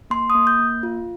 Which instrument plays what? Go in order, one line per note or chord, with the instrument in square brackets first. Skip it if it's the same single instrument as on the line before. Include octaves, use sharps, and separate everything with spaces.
[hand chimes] A#3 C6
A#3 D#6
G6
A#3
F4